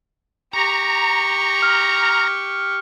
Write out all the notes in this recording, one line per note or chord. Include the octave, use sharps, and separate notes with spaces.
G4 A#5 C#6
F6